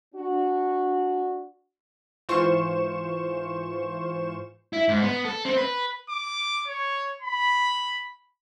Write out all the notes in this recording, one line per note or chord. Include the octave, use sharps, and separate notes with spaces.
D4 F#4
G#2 E3 F4 C5 C#6 E7
E4
G#2
B3
A4
C4
B4
D6
C#5
B5